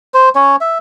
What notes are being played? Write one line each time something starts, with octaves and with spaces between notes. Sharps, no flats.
C5
C#4 C#5
E5